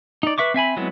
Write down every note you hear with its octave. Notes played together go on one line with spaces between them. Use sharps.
D#4 D5
B4 E5 C#6 D6
C4 E5 G#5 B5
F#3 G#3 B3 C4 E4